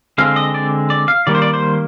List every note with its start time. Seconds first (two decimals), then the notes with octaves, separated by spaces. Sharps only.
0.18 D3 G#3 C4 F5
0.36 D#5
0.54 D5
0.90 D5
1.08 F5
1.27 D#3 G3 A#3 D5
1.35 C5
1.42 D5
1.53 C5